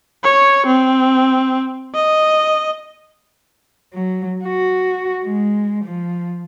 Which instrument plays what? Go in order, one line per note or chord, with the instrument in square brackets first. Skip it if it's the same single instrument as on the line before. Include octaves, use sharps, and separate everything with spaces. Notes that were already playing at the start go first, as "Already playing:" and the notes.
[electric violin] C#5
C4
D#5
[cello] F#3
F#4
G#3
F3